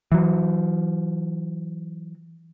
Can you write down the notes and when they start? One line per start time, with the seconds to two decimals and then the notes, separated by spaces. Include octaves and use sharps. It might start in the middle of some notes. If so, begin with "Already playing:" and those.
0.12 E3 F#3